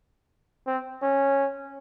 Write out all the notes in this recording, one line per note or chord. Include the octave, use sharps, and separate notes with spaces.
C4
C#4